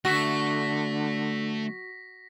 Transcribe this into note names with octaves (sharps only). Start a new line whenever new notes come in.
D3 A3 F#4 E5 A#6 B6